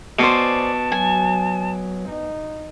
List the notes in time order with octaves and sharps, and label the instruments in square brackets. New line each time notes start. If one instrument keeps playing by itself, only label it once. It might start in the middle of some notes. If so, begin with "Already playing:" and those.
[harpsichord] B2 [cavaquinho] C5 D5 G#5 [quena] A5
[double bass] F#3 [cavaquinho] G#5
[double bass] D#4